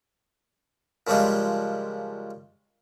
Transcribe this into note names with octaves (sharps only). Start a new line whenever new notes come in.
A#2 C#3 F3 G3 G#3